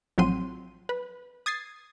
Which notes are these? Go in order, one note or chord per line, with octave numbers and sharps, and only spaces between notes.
A1 F3 F#3 C4 C6 D#7
B4
D#6 G#6 A6 C7